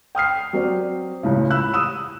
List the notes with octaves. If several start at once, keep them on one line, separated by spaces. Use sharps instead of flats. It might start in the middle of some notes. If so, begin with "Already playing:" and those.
G5 D#6 F6 C7
F#3 C4 D5
C#2 A2 C#3
B5 E6 F#6
D#6 E6 E7